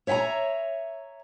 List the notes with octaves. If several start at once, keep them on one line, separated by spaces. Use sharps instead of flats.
C#5 E5 F#5 G#5 A#5